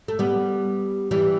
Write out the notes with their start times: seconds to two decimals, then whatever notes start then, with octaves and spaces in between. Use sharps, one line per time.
0.08 A3
0.19 G3 B3
1.11 E3 G3